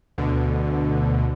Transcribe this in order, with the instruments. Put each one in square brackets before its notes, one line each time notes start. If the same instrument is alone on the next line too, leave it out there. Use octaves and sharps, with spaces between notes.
[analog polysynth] D2 B2 D3